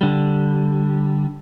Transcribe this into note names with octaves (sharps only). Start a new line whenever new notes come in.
D3 G3